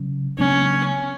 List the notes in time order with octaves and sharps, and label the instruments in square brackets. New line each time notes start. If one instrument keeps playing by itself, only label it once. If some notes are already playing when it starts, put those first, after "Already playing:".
Already playing: [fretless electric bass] C#3 F#3 C#4
[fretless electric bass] C#3 F#3 A#3 D4 [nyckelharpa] C#4